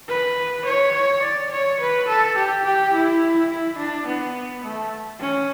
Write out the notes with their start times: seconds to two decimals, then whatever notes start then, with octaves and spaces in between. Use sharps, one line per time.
0.08 B4
0.65 C#5
0.94 C#5
1.22 D5
1.51 C#5
1.80 B4
2.08 A4
2.37 G4
2.64 G4
2.93 E4
3.50 E4
3.77 D4
4.07 B3
4.64 A3
5.20 C#4